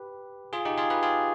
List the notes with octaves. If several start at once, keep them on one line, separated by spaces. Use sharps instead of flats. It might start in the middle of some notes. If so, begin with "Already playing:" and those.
Already playing: G4 B4
F4 G#4
D#4 G4
F4 G#4
G4 B4
F4 G#4